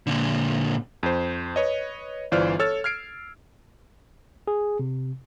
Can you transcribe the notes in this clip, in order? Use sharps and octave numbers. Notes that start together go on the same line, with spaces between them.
A#2 D3
F2 C5
B4 C#5 D#5
G1 E3 F4 C5 D5 F6
A4 C#5 E6 F6 A6
F6 G#6 C7 D7
G#4
C3